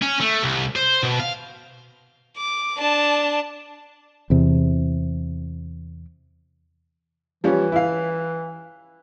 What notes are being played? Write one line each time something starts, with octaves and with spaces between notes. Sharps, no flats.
C#4
A3
C2
C5
B2
F5
D6
D4 A5
E2 C3
E3 F3 G3 C#4
E4 F5